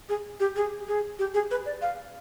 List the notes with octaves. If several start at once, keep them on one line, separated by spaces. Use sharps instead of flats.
G#4
G4
G#4
G#4
G4
G#4
B4
D5
F5